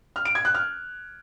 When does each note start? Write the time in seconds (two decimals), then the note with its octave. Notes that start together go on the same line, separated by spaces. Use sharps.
0.16 F6
0.25 D7
0.35 G#6
0.45 F#6
0.55 F6